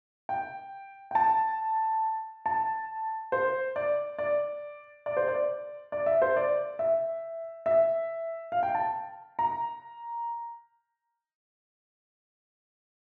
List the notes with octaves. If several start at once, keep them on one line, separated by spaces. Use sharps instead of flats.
G5
G5
A5
A5
C5
D5
D5
D5
C5
D5
D5
E5
C5
D5
E5
E5
F5
G5
A5
A#5